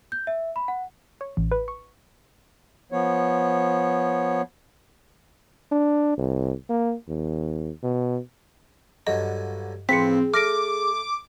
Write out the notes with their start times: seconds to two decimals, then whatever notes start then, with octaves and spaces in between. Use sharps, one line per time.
0.12 G6
0.27 E5
0.56 B5
0.68 F#5
1.21 C#5
1.37 A1
1.52 B4
1.68 C#6
2.92 F3 B3 C#5
5.72 D4
6.18 C2
6.69 A#3
7.09 D#2
7.83 B2
9.07 G2 D3 F#3 D#5
9.89 A1 F3 C4 G#4 B4 B6 C#7
10.34 A3 D6 F6 A#6 D7